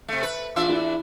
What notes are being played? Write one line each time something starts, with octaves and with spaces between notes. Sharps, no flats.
C3 A3
B4
E2 D4 F4 E5
E4